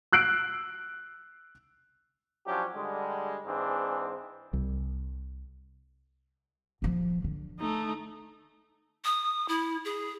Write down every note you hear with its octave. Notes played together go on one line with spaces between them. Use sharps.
E6 F#6 C7 D7
F3 F#3 C#4 D4 G4
D3 G3 G#3
G#2 E3 C4 D4 G#4
C2
D#1 F3
D3
A3 D#4
D#6
E4
G#4